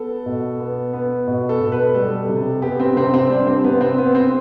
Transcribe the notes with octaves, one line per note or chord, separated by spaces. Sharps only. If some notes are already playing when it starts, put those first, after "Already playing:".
Already playing: B3 A4
B2
B3
B3
B2
A4
B2
B4
G3 A4
C3
B3 G4
C4
C3 C4
C4
G3 D4
C4
C3 B3
C4
B3
C4